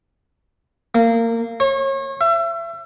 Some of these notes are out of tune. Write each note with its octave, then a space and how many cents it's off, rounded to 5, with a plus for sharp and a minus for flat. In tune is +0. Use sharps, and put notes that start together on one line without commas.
A#3 -25
C#5 -35
E5 +30